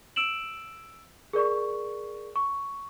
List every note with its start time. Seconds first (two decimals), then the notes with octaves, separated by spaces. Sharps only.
0.16 E6 D7 E7 F#7
1.33 G#4 A#4 D5 C#6
2.36 C#6